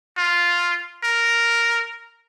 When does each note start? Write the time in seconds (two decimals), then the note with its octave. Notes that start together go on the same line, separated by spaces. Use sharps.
0.18 F4
1.04 A#4